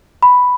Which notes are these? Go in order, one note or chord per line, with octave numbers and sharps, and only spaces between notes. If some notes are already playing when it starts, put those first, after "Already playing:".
B5